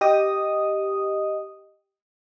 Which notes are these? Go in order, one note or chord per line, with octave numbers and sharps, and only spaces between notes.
G4 D#5 D#6